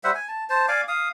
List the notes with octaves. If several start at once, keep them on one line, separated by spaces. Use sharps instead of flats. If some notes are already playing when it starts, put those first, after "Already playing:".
G3 C5 E5 F#5
G#5
A5
C5 A5
D5 F5 G#5 D6
F5 D#6